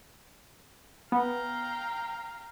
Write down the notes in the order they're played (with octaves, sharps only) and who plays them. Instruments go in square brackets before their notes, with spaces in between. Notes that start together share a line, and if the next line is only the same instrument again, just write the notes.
[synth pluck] B3 [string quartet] F5 G5 A#5